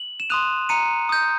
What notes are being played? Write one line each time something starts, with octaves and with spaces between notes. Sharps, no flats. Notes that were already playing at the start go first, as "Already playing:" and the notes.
Already playing: F#7
E7
C6 D#6 F#6 D#7 F7
A#5 C#7 D#7
D#6 G6